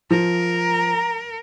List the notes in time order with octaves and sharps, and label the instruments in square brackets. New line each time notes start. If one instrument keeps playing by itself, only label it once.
[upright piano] F3 [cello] A#4
[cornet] A#5